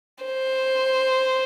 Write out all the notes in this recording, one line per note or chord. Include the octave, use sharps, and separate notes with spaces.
C5